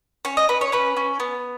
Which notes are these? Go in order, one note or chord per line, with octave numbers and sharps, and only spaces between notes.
C#4 C#5
D#5
C#4 B4
C#5
C#4 B4
C#4
B3